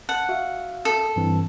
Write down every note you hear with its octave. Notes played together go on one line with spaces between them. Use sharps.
F#5 A5
F#4 E5 F5
A4
G2 E3 C4